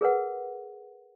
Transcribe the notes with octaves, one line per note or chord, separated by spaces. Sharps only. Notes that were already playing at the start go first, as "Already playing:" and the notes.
G#4 A#4 B4 F#5